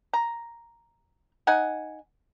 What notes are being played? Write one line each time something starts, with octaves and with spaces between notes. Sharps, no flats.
A#5
D#4 F#5 G#5